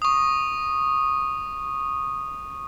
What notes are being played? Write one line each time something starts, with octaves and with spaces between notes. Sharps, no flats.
C#6 D#6